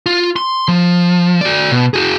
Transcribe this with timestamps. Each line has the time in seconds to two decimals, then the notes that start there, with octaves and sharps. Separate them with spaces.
0.06 F4
0.36 C6
0.68 F3
1.41 F#4 D5
1.72 B2
1.94 F#4 G#4